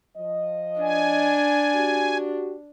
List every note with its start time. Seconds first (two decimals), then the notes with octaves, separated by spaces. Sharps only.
0.16 F3 D#5
0.81 D4 G#5
1.74 F#4 G4